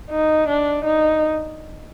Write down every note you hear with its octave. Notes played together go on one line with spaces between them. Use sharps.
D#4
D4
D#4